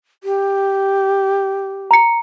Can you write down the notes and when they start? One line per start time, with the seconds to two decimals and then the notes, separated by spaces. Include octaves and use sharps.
0.24 G4
1.91 A#5 C#7